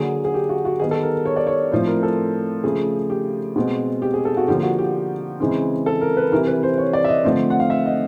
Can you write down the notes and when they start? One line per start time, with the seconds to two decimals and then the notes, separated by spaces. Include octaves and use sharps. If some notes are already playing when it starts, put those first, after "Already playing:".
Already playing: D3 F#3 A#3 G#4
0.25 G#4
0.34 G4
0.49 F#4
0.65 F#4
0.80 D#3 G3 B3 G#4
0.91 A4
1.02 A#4
1.25 C#5
1.36 D5
1.47 C#5
1.72 A2 F3 A3 C4 C5
1.87 A#4
2.03 A4
2.64 C#3 F3 A3 G#4
3.10 G4
3.56 B2 G#3 C4
4.02 G4
4.14 G#4
4.25 A4
4.37 F#4
4.48 D3 F3 A#3 G4
4.63 F#4
4.78 G4
5.40 C#3 E3 G#3 C4
5.86 A4
6.01 A#4
6.17 B4
6.32 C3 E3 G3 A#4
6.47 B4
6.63 C5
6.78 C#5
6.93 D5
7.04 E5
7.09 D#5
7.25 D3 F3 A3 C4
7.50 F#5
7.60 F5
7.70 E5
7.86 D#5